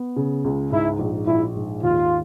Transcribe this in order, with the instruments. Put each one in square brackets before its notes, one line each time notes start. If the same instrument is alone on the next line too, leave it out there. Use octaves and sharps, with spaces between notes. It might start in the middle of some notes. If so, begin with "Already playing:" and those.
Already playing: [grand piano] B3
C#3
C#2
[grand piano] G#2 [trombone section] E4
[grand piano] A#1
[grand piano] A#1 [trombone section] E4
[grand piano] G#2
[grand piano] D#2 [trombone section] F4